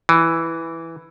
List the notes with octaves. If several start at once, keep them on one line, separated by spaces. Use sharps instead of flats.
E3